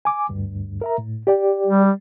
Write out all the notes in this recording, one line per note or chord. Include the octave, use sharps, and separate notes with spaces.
G#5 D6
D2 G2
A#4 E5 A#5
A2
G4 D5 G5
G3